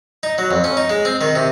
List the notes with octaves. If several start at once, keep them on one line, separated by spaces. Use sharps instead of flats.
D#4
F#3
F2
C#4
D#4
G#3
C4
D#3
C3